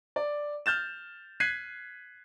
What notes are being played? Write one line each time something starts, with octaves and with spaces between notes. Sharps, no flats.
D5
F6 G6 A6 E7
F#6 G#6 B6 C7 D#7